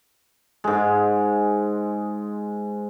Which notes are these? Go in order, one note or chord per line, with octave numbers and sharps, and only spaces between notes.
G#2 G#3